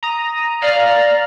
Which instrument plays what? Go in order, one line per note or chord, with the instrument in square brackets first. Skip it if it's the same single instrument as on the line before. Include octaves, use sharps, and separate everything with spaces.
[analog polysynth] A#5 D#6
[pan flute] D5 [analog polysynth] F5 A#5 F6